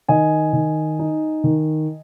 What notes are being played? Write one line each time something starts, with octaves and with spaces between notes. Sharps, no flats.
D#3 D#5 G#5
D#3
D#4
D#3